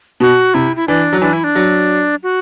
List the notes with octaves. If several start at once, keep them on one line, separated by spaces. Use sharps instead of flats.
B2 F#4
C3 E4
E4
E3 D4
F#3
E3 D4
E4
D4
F#3
F#4